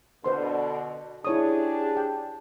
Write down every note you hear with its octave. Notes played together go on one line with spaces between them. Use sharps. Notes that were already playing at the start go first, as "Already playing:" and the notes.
B2 D3 B4 C5 C6
D4 E4 G4 G#4 C#5 D#6
G5